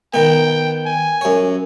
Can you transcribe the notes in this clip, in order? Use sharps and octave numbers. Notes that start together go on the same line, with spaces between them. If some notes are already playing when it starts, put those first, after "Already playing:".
D#3 B3 G5
G#5
F#2 C#5